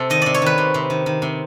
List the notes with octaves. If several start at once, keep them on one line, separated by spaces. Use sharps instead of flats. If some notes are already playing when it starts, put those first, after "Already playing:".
Already playing: C3 A4
D#3 D#5
C3 D5
C#5
D#3 B4
C3
C3
D#3
D#3
C3